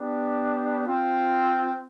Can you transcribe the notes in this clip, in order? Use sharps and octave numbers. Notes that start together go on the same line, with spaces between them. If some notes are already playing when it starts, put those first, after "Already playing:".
Already playing: B3 D4 G4
C4 F4